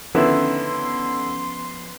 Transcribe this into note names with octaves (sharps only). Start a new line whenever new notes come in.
D3 D#3 F3 B3 C#4 E4 B4 C6